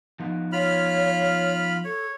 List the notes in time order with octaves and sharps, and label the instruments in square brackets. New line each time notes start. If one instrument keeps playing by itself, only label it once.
[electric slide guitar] F3 B3 D#4
[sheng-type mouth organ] F4 B5 F6 [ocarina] C#5
[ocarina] A4 [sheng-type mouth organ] C#5